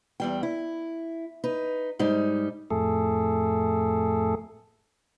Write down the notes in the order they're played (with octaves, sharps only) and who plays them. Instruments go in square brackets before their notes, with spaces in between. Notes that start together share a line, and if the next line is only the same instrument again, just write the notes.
[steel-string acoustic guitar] E2 G3 G5
E4
D#4 B4
G#2 G3 D#4
[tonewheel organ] F2 A2 A3 G#4 A4